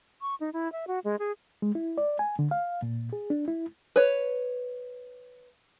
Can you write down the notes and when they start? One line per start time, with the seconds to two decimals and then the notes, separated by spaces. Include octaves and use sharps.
0.21 C#6
0.40 D#4
0.53 E4
0.72 E5
0.87 F#4
1.04 G#3
1.19 G#4
1.62 G#3
1.75 E4
1.98 D5
2.19 G#5
2.39 D3
2.51 F5
2.82 A#2
3.13 G#4
3.30 D4
3.48 E4
3.96 B4 C#5